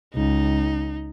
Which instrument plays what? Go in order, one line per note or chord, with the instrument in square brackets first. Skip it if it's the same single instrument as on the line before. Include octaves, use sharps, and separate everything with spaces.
[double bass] C#2 [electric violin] D#4